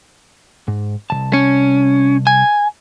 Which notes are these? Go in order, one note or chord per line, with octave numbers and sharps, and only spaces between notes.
G#2
C2 C#3 A5
C#4
G#5